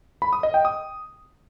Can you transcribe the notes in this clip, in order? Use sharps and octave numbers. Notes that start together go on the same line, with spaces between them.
B5
D#6
D#5
G5
D#6